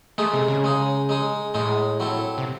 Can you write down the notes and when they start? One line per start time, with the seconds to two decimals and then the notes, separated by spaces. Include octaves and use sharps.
0.18 G#3 A3 D#4 G#4
0.33 C3
0.48 C#3
0.64 G#3 D#4 G#4
1.09 G#3 D#4 G#4
1.54 A2 G#3 D#4 G#4
2.00 F#3 C4 E4 A4
2.38 C3